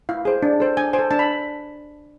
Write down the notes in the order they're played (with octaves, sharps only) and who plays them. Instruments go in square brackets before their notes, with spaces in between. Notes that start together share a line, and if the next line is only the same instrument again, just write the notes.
[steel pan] E4 F5
G#4 C5
D4
A4 C5
D4 G#5
C5 G#5
A4
D4 A5
B5